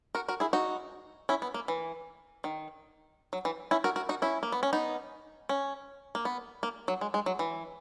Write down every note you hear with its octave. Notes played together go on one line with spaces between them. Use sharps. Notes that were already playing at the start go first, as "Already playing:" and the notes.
F#4 A#4
F#4 A#4
E4 G#4
D#4 F#4
C#4 E4
B3
A#3
E3
D#3
F#3
E3
C#4 E4
F#4 A#4
F#4 A#4
D#4 F#4
C#4 E4
A#3
B3
C#4
B3 D#4
C#4
A#3
B3
A#3
F#3
G#3
G#3
F#3
E3